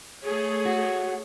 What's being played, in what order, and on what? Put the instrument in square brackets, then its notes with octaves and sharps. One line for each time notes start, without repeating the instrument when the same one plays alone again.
[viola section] A3 G#4 [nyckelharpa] C#5
[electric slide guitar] F#4